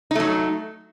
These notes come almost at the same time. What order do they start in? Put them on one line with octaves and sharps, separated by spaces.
D#4 A3 F#3